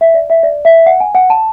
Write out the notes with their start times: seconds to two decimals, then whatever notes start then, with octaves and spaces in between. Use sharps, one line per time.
0.01 E5
0.14 D5
0.30 E5
0.43 D5
0.65 E5
0.86 F#5
1.00 G#5
1.15 F#5
1.30 A5